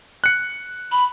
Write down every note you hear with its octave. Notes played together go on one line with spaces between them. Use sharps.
F#6 C#7
B5